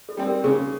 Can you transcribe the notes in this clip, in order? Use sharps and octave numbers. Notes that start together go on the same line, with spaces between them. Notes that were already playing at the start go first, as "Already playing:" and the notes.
A4
G3 C4
A#4
C#3 G#4